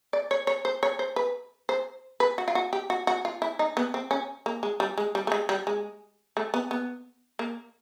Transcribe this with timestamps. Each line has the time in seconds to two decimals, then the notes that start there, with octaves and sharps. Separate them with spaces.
0.13 D5
0.31 C#5
0.47 C#5
0.65 C5
0.83 C#5
0.99 C5
1.16 B4
1.69 C5
2.20 B4
2.38 F#4
2.48 F4
2.55 F#4
2.73 G4
2.90 F#4
3.07 F#4
3.25 F4
3.42 E4
3.59 D#4
3.77 B3
3.94 C4
4.11 C#4
4.46 A#3
4.63 G#3
4.80 G3
4.98 G#3
5.15 G3
5.27 A3
5.32 G#3
5.49 G3
5.67 G#3
6.37 A3
6.54 B3
6.71 B3
7.39 A#3